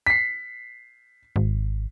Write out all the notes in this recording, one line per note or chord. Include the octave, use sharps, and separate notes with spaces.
B6 C7
G#1